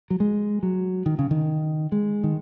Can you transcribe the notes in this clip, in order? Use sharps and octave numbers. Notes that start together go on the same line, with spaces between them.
F#3
G#3
F#3
D#3
C#3
D#3
G#3
D#3